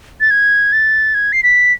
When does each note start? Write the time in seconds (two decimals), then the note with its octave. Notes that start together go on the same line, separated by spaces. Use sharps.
0.21 A6
0.31 G#6
0.73 A6
1.15 G#6
1.33 C7
1.43 B6